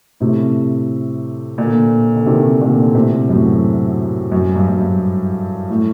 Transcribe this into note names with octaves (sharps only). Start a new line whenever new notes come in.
A2 C3
A#2 D3
D3
C3 D#3
A#2 D3
A2 C3
F#2 A2
F#2
G2
F#2
G2
A2